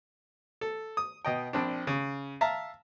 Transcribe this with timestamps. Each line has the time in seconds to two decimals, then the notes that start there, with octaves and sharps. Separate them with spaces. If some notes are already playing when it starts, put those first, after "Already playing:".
0.61 A4
0.97 D#6
1.25 B2 D#5 G5
1.53 A#1 C4 D4
1.87 C#3
2.41 E5 F5 A5 A#5